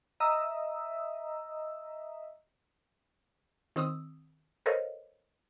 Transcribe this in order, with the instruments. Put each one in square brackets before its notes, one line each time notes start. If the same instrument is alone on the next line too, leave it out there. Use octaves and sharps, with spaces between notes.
[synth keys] D#5 E5 A#5 D#6 E6
[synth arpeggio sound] D#3 C4 D#6 E6
A4 A#4 C5 C#5 D#5 F5